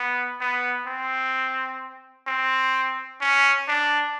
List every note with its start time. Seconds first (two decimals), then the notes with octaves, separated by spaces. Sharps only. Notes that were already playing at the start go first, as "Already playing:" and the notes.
Already playing: B3
0.41 B3
0.87 C4
2.27 C4
3.21 C#4
3.68 D4